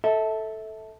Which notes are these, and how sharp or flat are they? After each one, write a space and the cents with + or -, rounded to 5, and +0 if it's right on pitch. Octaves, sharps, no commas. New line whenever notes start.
A4 +0 E5 -25